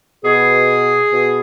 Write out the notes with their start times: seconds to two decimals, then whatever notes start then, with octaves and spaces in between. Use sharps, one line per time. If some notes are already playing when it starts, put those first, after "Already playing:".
0.24 B2 G#4
1.12 B2